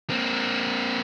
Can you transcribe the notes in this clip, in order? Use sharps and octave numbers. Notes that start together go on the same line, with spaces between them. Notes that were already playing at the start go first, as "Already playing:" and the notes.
A#3 C4